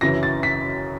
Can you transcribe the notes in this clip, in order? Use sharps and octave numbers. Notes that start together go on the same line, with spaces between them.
F#2 C#3 E3 A#6
A6
B6